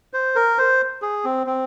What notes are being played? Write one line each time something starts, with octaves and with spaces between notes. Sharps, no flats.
C5
A#4
C5
G#4
C4
C4